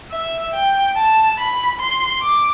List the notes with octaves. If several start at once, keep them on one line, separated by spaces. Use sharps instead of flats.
E5
G5
A5
B5
C6
D6